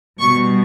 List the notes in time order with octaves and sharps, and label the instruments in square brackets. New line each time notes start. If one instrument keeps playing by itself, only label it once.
[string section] B2 G3 C#6